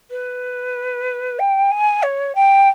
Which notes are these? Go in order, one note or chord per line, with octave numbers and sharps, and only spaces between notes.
B4
G5
G#5
C#5
G5